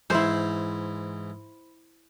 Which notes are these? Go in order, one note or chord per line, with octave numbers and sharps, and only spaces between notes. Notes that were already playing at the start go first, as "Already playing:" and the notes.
G#2 E3 E4 C5